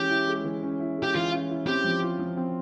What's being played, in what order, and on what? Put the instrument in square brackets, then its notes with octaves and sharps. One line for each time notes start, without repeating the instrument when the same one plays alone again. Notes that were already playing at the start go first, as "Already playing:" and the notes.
Already playing: [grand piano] E3 G#3 C#4 [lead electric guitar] G4
[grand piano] E4
G#3
E3
C#4
E4
G#3
[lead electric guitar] G4
[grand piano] E3 [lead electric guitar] F4
[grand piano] C#4
E4
[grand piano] C4 [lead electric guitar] G4
[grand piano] F3
F4
F3
C4